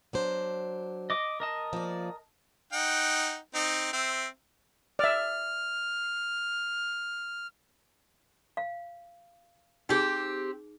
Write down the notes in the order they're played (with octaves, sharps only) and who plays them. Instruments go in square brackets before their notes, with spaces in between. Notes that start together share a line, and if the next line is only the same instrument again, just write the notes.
[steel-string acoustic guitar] F#3 D4 C5
[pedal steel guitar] D#5 D6
A#4 D#5 A5
[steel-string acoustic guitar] F3 A#3 D5
[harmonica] D#4 F#5 G5
C4 D#4
C4 C5 E5
[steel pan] D5 E5 [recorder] F6
[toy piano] F5
[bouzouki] C4 G4 [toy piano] D#4 G#4